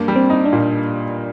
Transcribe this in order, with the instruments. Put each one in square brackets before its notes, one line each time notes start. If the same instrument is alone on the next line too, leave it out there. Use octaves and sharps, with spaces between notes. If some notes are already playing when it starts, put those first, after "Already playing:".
Already playing: [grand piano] G2 A#3
G3
[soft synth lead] C4
[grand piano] D#4
[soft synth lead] D4
[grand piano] A#2